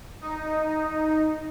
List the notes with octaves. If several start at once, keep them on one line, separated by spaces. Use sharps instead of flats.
D#4